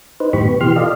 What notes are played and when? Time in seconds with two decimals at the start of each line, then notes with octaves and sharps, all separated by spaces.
0.20 D#4 B4 C5
0.33 F#2 A2 D#3 G4 B5 C#6
0.45 B3
0.61 B2 E3 G4 C6 F6
0.76 F4 A4 D5 D#5 F5